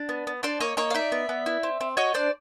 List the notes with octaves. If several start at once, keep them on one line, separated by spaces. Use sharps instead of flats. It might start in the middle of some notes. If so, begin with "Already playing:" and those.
Already playing: D4
B3
B3
D4 C5 D5
A#3 C#5 D#5
A#3 C#5 D#5
F5
D#4 D5 E5
B3
B3
E4
C4
C4
F#4 C#5 D#5
D4 C5 D5